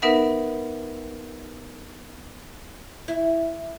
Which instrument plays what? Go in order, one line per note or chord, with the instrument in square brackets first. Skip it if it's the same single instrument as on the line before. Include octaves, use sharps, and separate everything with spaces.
[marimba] B3 D#4 A#4 B4 E5 F#5
[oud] E4